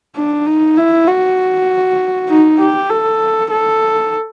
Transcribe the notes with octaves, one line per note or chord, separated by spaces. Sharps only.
D4
D#4
E4
F#4
D#4
G4
A4
A4